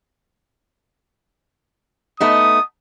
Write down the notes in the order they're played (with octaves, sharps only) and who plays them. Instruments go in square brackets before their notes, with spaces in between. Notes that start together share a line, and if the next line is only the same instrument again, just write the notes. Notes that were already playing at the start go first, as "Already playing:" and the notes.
[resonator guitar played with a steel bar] A3 B3 D#4 [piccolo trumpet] D#6